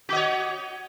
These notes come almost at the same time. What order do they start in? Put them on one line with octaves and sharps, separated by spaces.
F#4 D#5 C#5